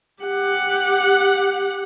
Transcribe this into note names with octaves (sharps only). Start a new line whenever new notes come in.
G4 F#5